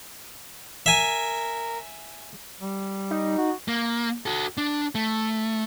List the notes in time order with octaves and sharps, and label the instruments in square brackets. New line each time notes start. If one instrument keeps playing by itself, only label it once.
[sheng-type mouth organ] A#4 [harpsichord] E5 G#5
[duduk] G3
[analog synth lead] D#4
[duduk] F#4
[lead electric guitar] A#3
F#4 A4
D4
A3